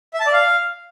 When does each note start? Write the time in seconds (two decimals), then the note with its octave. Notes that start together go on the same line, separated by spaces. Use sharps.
0.14 E5
0.20 A5
0.26 D5
0.33 F5